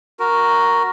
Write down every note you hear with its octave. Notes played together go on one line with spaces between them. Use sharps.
F#4 A#4